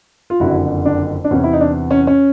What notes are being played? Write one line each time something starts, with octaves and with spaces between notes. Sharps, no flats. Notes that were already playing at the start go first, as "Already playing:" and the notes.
F4
F#1 F2 D3 E4 F#4
D4
D4
E2 C3 E3 C#4
E4
D#4
D4
C#4
C#4